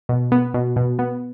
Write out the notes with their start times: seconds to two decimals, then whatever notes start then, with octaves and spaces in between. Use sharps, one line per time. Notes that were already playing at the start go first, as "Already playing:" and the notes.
0.09 B2
0.32 B3
0.54 B2
0.76 B2
0.99 B3